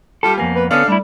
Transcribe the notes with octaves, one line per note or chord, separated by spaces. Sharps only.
G3 F4 G4 A4
F2 A#3 B3 G#5
B4
D3 B3 C#4 D4 A4 F5
G3 A3 E4